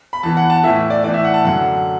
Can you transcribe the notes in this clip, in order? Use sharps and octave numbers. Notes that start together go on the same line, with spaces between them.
B5
E2 E3 A5
F#5
A5
A2 E3 E5
D5
A2 E3 D5
E5
F#5
A5
F#2 D3 F#5